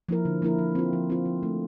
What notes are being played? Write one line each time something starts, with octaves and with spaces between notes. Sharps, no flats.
F3 A#3 E4 A#4
D3
F3 A#3 E4 A#4
F3
C4 F4
F3
C4 F4
F3
A3 D4